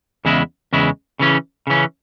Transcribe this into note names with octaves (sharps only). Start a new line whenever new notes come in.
E2 C#3 G#3 E4
E2 C#3 G#3 E4
C#3 E3 C#4
C#3 E3 C#4